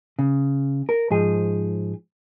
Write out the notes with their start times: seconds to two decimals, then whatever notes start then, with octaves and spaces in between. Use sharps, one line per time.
0.19 C#3
0.89 A#4
1.11 G#2 F3 G#4